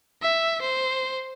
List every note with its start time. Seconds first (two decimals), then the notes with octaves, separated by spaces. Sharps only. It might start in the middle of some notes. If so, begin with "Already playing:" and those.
0.22 E5
0.61 C5